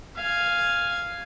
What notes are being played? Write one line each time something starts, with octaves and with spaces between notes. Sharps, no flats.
F5 G#5